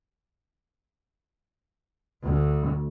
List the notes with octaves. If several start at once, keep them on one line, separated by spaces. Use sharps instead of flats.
D2